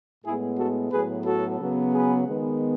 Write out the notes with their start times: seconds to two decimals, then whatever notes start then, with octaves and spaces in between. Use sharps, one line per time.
0.24 A2 G#3 B3 E4 G#4
0.58 F#4 A4
0.92 A2 F#3 B3 G#4 B4
1.26 F#4 A4
1.60 C#3 F#3 B3
1.94 G#4 B4
2.28 D#3 G#3 B3